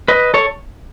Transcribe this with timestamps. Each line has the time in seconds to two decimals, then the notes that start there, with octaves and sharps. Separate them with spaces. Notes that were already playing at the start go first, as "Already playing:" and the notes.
0.08 B4 D#5
0.34 A4 C#5